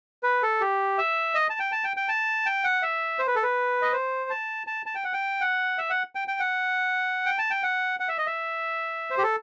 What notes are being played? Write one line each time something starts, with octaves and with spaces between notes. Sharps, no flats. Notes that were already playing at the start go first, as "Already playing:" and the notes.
B4
A4
G4
E5
D#5
A5
G5
A5
G5
G5
A5
G5
F#5
E5
C5
B4
A4
B4
D#5
C5
A5
A5
A5
G5
F#5
G5
F#5
E5
F#5
G5
G5
F#5
G5
A5
G5
F#5
F#5
E5
D#5
E5
C5
G4
A4